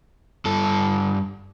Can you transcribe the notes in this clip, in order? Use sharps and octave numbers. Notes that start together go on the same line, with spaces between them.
G2 A4